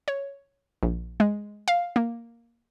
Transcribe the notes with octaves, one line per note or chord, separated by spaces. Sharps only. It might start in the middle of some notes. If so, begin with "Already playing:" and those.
C#5
A#1
G#3
F5
A#3